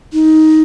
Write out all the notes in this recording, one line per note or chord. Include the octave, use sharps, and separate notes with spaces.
D#4